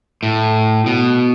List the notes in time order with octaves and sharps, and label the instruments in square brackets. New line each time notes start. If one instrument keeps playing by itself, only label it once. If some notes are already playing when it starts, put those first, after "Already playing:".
[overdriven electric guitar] A2
B2